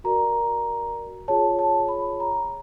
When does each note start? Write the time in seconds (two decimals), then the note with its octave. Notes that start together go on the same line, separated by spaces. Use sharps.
0.04 F#4 A#4 D5 A#5
1.28 F4 G#4 C#5 A5
1.59 A5
1.88 B5
2.20 A#5